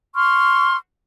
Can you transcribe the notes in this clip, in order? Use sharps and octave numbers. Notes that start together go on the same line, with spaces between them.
C6 C#6 F6